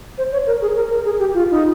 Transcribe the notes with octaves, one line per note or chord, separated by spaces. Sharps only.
C5
C#5
A#4
G#4
A#4
A#4
G#4
G4
F4
D#4